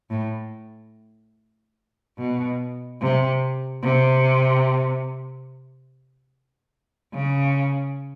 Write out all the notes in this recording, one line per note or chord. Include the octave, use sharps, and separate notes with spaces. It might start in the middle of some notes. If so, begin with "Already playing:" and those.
A2
B2
C3
C3
C#3